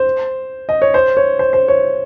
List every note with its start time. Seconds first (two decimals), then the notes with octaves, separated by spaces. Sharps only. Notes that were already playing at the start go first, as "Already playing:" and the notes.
Already playing: C5
0.69 D#5
0.82 C#5
0.94 C5
1.17 C#5
1.39 C5
1.53 C5
1.68 C#5